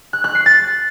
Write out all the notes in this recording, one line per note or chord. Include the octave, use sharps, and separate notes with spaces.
F#6
F#6
C7
A6